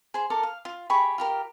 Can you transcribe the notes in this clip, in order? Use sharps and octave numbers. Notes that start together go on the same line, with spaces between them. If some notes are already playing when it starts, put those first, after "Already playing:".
G#4 C5
A4 A#4 D6
F5
F4
G4 G#4 B5 C#6
F4 G4 A#4